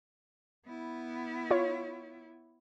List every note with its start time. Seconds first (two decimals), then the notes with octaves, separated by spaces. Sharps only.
0.66 B3 E4
1.51 F4 C#5